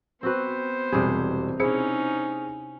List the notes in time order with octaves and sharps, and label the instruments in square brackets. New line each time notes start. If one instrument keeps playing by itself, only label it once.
[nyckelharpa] B3 C5 [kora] C4 F#4 B4
[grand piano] E1 G3 B5 [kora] C3 G#4
[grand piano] C4 G#4 C#7 [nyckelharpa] C#4 D#4 [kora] E4